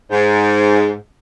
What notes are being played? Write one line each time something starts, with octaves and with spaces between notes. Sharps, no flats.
G#2